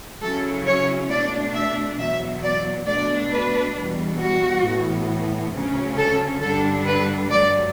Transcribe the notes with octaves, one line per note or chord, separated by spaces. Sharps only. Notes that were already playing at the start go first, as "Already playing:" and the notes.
C#3 F#3 C#4 E4 A4
C#5
B2 A3 D4 D5
E5
E2 B2 F#3 E5
D5
B2 A3 D4 D5
B4
E2 B2 G3
F#4
A2 E3 B3
D2 C#3 F#3 C#4
A4
G2 D3 G3 D4 A4
B4
G2 F#3 A3 D5